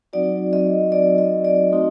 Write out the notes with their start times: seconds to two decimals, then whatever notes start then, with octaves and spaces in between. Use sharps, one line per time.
0.13 F#3 C4 D#4 F#4 D5
0.53 D#5
0.92 D5
1.18 D#5
1.45 D5
1.71 A3 C4 D#4 F#4